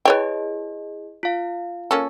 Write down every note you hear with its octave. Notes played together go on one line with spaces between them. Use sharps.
E4 G#4 B4 C#5 D#5 G5
F4 F5
A#3 C#4 A4